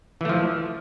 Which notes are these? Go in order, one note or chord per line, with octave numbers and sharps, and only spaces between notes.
E3 F3 A3